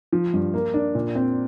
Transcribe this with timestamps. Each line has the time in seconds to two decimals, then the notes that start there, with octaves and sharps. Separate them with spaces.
0.13 F3
0.34 G2
0.54 A#3
0.74 D4
0.95 A#2
1.15 C4